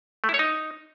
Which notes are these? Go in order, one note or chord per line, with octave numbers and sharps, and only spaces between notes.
A3
E4
C#5
D#4